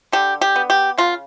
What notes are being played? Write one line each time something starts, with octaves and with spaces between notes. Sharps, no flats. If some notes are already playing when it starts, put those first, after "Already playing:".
D3 G4
G4
B3
G4
C#3 F4